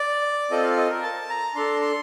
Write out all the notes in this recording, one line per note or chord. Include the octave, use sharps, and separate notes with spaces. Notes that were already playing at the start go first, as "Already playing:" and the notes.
Already playing: D5
C4 F4 A4 D#5
F5
D#5
A#4
A5
A#5
D4 A4 C6
C6